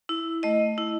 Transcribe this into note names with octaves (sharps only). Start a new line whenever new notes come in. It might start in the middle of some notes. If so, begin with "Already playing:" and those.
E4
A3 D#5
E4